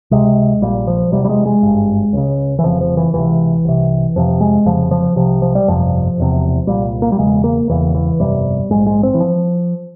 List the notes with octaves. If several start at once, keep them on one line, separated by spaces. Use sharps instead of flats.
C#2 C3 G#3
A#1 A#2 G3
F3
E1 E2 C3 G3
G3
G#3
G#3
G#1 G2
C#2 C#3
E3
F1 F2 C#3 F3
F3
E3
C#2 C3 E3
C2 C3
F1 F2 C3 F3
G#3
F1 F2 C#3 F3
F3
C2 C3 F3
F3
G3
G1 F2 C3 F3
E1 E2 C3
C2 A#2 G3
A#3
G3
E1 E2 C#3 G#3
A#3
E1 E2 C#3 E3
E3
G1 F2 C3 G3
A#1 G#2 G#3
G#3
C4
E3
F3